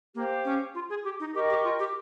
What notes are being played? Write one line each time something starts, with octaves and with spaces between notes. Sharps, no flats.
A#3 G4 C5 F5
C#4
F4
G#4
G4
D#4
G4 A#4 D#5 G5 C#6
G4
F4
G4